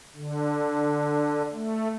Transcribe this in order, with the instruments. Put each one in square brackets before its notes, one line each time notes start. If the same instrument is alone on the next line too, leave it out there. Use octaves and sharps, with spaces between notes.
[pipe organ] D3
A3